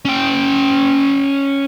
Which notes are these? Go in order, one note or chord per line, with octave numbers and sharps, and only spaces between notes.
C#4 G5